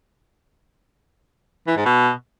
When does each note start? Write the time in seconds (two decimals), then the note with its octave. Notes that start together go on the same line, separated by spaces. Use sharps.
1.67 E3
1.76 G#2
1.86 B2